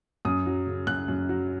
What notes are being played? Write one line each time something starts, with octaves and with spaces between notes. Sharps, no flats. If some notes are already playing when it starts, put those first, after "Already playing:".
F#2 D#6
F#3
C#3
F#2 F#6
F#2
F#3